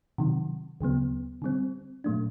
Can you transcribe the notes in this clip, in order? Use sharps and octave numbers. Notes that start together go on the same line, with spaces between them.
C3 D#3 F#3
D2 C#3 F#3 B3
D3 G3 C4
A#2 F#3 A3 D4